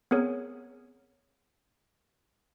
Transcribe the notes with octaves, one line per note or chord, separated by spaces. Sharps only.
B3 C4 G#4 A#4 C#5